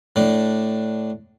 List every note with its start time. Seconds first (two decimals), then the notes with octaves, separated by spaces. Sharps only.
0.16 A2 D4